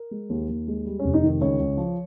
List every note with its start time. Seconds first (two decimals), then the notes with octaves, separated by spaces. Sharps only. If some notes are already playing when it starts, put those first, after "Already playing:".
Already playing: A#4
0.11 G#3
0.30 D#2
0.49 D#2
0.68 G#3
0.86 G3
0.99 F1 C#4
1.14 D#4
1.23 D#3
1.41 C#2 C#5
1.59 C#2
1.77 F3